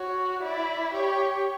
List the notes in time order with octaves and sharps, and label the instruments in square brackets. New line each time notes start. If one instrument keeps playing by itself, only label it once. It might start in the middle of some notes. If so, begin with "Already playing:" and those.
Already playing: [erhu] F#4 [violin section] C#5
[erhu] E4 [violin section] D5
[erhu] G4 [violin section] C#5